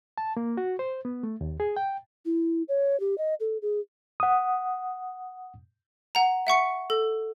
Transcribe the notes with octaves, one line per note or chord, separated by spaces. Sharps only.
A5
A#3
F#4
C5
B3
A3
D#2
G#4
G5
E4
C#5
G4
D#5
A4
G#4
F#5 D#6
F#5 A#5
E5 F#5 C#6 C#7
A4